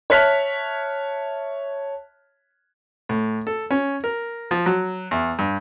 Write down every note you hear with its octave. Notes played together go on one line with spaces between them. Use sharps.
C#5 E5 A5 F6 F#6 B6
A2
A4
C#4
A#4
F3
F#3
E2
G2